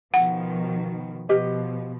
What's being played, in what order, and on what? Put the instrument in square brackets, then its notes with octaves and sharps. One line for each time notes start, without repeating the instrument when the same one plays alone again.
[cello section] B2 D#3 F3 [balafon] F#5
[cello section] B2 F3 [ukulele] G4 B4 D#5